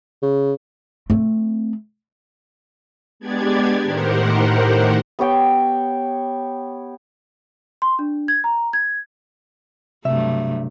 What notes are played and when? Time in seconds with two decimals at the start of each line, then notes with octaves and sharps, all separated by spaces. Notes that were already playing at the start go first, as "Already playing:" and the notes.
0.22 C#3
1.10 A3 C4
3.20 G#3 B3 D4 G4 D5 G#6
3.83 A2 D#3 G4 A#4 C5 F#5
5.19 B3 G4 C#5 G5
7.82 C6
7.99 D4
8.28 G#6
8.44 A#5
8.73 G#6
10.05 G2 C3 F#3 A3 E5